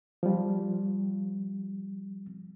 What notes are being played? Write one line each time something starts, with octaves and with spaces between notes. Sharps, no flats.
F3 G3